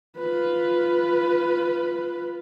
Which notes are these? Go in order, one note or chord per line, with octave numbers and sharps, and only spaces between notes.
F4 B4